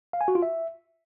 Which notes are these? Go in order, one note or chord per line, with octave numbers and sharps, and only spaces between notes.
F5
G#5
F#4
F4
E5